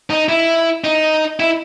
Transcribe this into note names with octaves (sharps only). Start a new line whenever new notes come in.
D#4
E4
D#4
E4